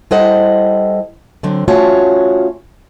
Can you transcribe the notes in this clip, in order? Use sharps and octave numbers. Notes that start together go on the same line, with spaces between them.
G3 E4 A4 C5 D#5 F#5
D3 F#3 C4
A3 C#4 F4 F#4 C#5 A5